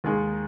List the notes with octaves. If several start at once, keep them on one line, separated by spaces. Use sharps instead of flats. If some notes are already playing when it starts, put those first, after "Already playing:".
D#2 D#3 G#3 D#4 G#4